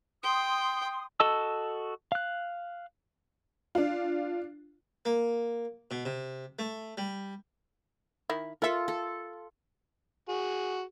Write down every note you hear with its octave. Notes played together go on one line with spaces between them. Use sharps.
G5 C6 D#6
F#4 A4 D#5 A5 E6
F5 F#6
D4 F4
A#3
B2
C3
A3
G3
D#3 E4
F4 A4 A#4 E5
A4
F#4 G#4